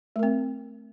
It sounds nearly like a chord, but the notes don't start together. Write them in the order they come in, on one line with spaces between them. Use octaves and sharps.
A3 A#4 C4